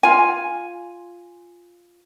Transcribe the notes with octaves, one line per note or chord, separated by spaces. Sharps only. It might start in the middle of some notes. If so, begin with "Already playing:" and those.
F4 G#5